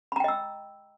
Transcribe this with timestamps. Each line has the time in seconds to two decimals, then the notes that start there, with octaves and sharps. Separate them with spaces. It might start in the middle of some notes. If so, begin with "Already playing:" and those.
0.12 B5
0.16 A#5
0.20 G5
0.24 D#5
0.28 E6